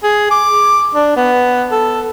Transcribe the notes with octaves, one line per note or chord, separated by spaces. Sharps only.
G#4
D6
D4
B3
A4